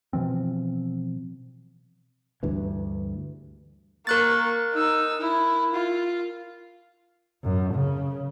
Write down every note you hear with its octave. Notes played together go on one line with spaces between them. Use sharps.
B2 E3 F3 C4
D2 G2 E3
A#3 A#4 C#6 F#6 A6
D#4 E6
E4
F4
F#2
C#3